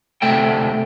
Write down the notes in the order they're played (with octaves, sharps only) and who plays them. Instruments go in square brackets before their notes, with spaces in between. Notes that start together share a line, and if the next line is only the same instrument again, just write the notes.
[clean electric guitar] D2 C3 A3 A4 E5 G5